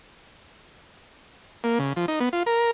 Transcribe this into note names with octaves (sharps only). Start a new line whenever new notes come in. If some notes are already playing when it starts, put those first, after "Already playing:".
A#3
C#3
F3
D#4
B3
F4
A#4